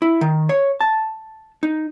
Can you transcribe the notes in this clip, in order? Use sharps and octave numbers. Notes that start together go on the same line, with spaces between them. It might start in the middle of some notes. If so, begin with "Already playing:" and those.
E4
D#3
C#5
A5
D#4